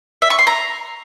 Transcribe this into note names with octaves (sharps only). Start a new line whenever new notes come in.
E5
C#6
C6
A#5